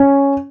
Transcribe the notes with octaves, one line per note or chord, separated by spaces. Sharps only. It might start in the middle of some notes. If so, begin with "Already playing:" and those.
Already playing: C#4